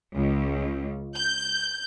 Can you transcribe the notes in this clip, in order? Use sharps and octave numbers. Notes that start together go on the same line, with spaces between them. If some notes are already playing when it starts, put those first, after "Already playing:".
C#2
G6